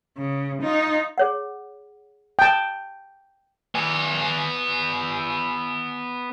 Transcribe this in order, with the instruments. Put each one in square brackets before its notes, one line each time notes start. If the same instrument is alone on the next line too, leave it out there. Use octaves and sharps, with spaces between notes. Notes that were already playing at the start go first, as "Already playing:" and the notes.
[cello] C#3
D#4 F4
[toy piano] G#4 C#5 F#5
[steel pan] G5 A5
[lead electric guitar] B3 G#5